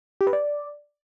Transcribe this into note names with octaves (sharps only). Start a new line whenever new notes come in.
G4
B4
D5